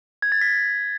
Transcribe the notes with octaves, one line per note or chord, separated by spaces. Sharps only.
G#6
A6
B6